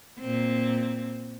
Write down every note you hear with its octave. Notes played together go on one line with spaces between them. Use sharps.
A#2 C4